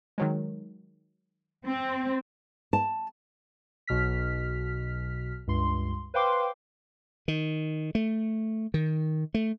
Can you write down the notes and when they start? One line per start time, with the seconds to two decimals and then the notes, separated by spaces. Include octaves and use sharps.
0.18 D#3 F#3 G#3
1.66 C4
2.73 A5
3.87 B1 B2 F6 B6
5.47 C#2 G2 C6
6.14 B4 C5 F5 G5 C6 D6
7.28 D#3
7.95 A3
8.74 D#3
9.34 A3